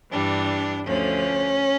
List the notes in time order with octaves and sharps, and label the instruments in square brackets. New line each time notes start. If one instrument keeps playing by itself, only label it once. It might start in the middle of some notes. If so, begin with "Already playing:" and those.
[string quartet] G2 E3 G3 D4
D2 D3 F3 C#4